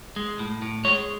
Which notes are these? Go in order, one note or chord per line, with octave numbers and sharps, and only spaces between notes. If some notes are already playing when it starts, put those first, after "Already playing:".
G#3
A2
A2
G#3 C#5